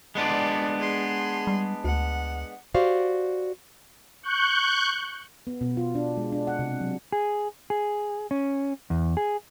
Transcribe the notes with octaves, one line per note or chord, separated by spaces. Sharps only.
G#3 B3 D4 D5 C6
G#4 C6
G3
D2 F#5
F#4 G4 C5 D5 F5
C#6 F#6 G6
B3
B2
F4
D4
G#3
D4
F#5
C3
F#3
G#4
G#4
C#4
E2
G#4